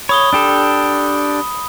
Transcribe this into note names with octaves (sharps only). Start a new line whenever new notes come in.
C#5 B5 D#6 G7
D4 G4 A4